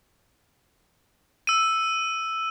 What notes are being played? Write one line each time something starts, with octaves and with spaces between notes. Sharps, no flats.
E6 D#7